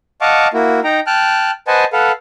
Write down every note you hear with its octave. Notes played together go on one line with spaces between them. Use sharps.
D#5 F5 F#5 A5 C#6 D6
A#3 E4 F#4
D#4 G5 A#5
G5 A5 F6 F#6
B4 C5 D#5 F#5 G#5 A5
A4 B4 F5 F#5